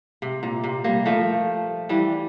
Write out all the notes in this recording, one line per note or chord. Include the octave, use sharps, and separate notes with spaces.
C3
A#2
C3
G3 A#3
F3 A3
E3 G3